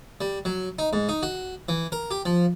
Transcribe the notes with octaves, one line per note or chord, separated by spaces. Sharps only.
G3
F#3
D#4
G#2
D#4
F#4
E3
A#4
G4
F3